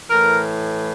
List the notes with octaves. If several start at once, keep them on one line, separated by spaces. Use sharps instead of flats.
A2 E3 A#4